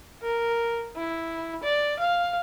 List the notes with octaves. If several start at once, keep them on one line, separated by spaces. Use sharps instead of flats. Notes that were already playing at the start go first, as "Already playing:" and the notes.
A#4
E4
D5
F5